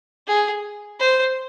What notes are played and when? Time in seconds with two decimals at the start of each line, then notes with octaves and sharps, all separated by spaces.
0.27 G#4
0.99 C5